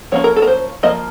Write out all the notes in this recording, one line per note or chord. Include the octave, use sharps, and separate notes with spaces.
F3 A#3 C#4 C#5
A#4
A4
A#4
C5
F3 A#3 D#5